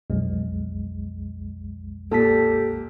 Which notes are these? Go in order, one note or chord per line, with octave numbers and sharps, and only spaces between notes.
B1 F2 G#3
A#2 G4 A4 A5 B6